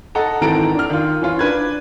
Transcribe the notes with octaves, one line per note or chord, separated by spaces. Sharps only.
A4 D#5 F#5 A#5
G#1 D#3 E3 A4 A#5 D7
D4 F6
D#3 F4
E3 C#4 F4
D4 B4 G#6